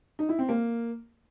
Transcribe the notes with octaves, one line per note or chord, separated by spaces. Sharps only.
D#4
E4
C4
A#3